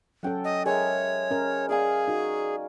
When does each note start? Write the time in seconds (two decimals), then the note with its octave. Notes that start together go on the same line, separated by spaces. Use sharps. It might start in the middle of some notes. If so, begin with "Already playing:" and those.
0.23 F#3 C#4 A4 F#5 G5
0.44 D#5
0.66 G#3 G#4 A#4 C#5 E5
1.31 C#4 A#4
1.69 G#4 D5 F5 G#5
2.08 D#4 F#4